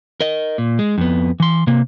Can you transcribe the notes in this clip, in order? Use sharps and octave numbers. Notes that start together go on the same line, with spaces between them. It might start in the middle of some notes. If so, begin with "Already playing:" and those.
A#4 D#5
A#2
G#3
F2 B3
E3 C6
C3 A#3